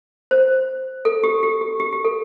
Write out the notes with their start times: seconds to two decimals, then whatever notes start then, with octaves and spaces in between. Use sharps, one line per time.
0.31 C5
1.05 A4
1.24 G4
1.43 G4
1.61 G4
1.80 G4
1.93 G4
2.05 A4